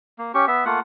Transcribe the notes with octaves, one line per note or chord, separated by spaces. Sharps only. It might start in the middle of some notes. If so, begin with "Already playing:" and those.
A#3
C#4 G4 C#6
B3 E5
A3 A#3 F4 F#5